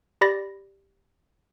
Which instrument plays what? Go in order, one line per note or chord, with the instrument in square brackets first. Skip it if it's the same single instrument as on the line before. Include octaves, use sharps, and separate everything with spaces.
[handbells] G4 D5 B5 A6 A#6